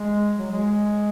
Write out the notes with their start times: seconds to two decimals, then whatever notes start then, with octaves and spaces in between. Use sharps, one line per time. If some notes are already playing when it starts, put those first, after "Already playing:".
Already playing: G#3
0.38 F#3
0.51 G#3